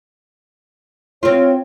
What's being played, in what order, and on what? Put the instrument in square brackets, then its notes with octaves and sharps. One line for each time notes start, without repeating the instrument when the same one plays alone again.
[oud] C4 F4 [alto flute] C#5